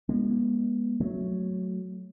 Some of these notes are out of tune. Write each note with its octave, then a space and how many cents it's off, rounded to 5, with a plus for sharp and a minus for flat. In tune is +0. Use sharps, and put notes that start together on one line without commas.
G#3 -20 B3 -40
F#3 +0 A3 +0